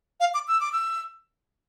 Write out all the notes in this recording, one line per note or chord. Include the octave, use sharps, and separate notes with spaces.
F5
D6
E6
D6
E6